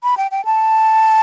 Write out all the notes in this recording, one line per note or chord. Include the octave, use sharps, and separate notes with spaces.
B5
G5
G5
A5